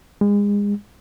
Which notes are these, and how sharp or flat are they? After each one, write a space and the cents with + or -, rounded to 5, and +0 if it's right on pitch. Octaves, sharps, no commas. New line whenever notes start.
G#3 -30